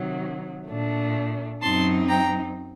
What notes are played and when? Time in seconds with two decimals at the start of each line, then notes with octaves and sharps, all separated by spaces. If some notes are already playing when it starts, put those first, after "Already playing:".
Already playing: C3 D#3 F#3
0.69 A#2 A3 D4
1.62 F#2 F#3 C4 D#4 A5 C6
2.09 G5 A#5